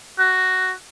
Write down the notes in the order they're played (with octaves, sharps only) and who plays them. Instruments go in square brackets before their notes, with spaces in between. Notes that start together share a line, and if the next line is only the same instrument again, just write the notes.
[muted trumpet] F#4